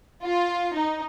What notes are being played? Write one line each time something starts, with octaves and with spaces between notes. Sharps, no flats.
F4
D#4